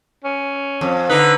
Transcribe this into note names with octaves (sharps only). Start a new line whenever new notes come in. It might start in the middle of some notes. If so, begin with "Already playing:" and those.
C#4
F2
D3 D#4 B4